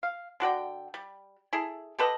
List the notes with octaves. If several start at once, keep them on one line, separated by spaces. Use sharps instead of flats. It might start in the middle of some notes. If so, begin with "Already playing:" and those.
F5
D3 F#4 D5 G5
G3
E4 G#4 A4
G4 A4 B4 D#5